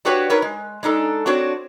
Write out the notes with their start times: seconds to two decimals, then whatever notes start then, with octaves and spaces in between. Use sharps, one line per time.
0.05 D4 F#4 G4 B4 C#5
0.30 D#4 A#4 B4 C#5
0.42 G#3
0.83 G#3 D4 D#4 A4
1.26 C4 D4 F#4 C#5